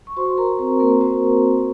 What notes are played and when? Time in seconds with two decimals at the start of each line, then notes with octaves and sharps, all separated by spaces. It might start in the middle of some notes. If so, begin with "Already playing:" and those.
0.07 C#6
0.16 F#4 C5 C6
0.37 A#4 A#5
0.59 C4 C5
0.80 A#3 A#4
1.01 C4 F#4 C5